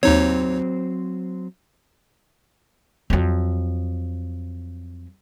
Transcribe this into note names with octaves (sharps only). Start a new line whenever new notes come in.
D#2 F#3 C4 D#4 C5 C#5
F2 F#3